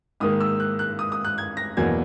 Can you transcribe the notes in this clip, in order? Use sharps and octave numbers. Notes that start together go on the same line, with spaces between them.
G#2 D#3 A#3 D#6
E6
F#6
F#6
D#6
D#6
F#6
G#6
A#6
E2 B2 F#3 A#3 G#6